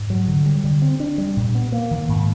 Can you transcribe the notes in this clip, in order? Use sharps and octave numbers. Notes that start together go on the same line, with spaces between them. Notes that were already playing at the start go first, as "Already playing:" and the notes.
Already playing: G#2
F#3
D3
G3
D3
C4
D4
G3
A#2
B3
A#3
D#3
G#2